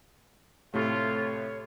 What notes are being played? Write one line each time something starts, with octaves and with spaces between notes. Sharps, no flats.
A2 C3 A3 F4 G4 A4 C#5